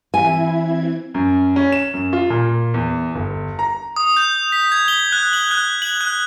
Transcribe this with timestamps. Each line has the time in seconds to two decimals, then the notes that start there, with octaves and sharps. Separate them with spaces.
0.14 E3 C4 E4 G#5 G#6
1.14 F#2
1.56 C#4
1.72 E7
1.94 F#2
2.13 F4
2.30 A#2
2.74 E2
3.15 G1
3.59 A#5
3.96 D#6
4.17 G6
4.52 B6
4.72 G#6
4.88 G7
5.12 F#6
5.33 F#7
5.51 F#6
5.82 F#7
6.01 F#6